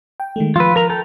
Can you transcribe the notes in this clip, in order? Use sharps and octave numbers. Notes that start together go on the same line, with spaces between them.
G5
D#3 G#3 A3
F3 F4 B4 E6
A#4 A#5
A4 G5